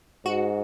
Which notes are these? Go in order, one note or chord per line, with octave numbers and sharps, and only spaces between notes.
G#2 F#4